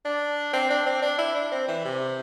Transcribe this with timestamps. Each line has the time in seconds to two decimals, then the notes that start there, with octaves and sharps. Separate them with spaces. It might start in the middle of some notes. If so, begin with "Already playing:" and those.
0.05 D4
0.53 C4
0.70 D4
0.86 C4
1.02 D4
1.18 E4
1.35 D4
1.52 C4
1.68 E3
1.85 C3